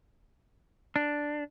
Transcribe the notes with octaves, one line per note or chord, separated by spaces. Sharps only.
D4